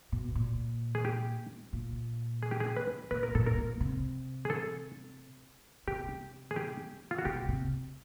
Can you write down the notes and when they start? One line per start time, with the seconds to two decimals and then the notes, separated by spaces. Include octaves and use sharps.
0.12 B2
0.35 A#2
0.95 G#4
1.05 G4
1.73 A#2
2.43 G#4
2.51 G4
2.60 G#4
2.77 B4
3.11 A#2 B4
3.23 A#4
3.35 A#2 A4
3.46 A#4
3.58 A#2
3.80 C3
4.45 G#4
4.50 A4
5.87 C3 G4
6.51 G#4
6.56 G4
7.11 F4
7.18 F#4
7.25 B2 G4
7.48 C3